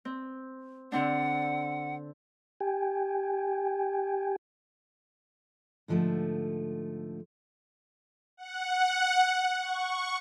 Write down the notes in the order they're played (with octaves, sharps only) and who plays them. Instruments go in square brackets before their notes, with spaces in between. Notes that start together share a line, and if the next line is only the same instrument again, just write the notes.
[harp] C4
[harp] D3 C4 D4 [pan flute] F#5
[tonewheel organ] G4 G5 G#5
[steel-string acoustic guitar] G#2 D3 F3 G3 A3
[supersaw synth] F#5
C#6